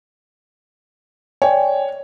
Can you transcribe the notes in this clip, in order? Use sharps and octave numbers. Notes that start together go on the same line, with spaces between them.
C#5 D5 G5 G#5